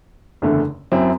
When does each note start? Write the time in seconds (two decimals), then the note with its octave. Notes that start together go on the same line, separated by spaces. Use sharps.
0.42 F#1 E2 D3 A3
0.92 F#2 F#3 C4 E4